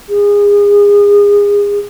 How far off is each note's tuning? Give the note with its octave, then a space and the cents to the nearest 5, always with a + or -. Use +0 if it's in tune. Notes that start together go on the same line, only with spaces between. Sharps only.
G#4 -30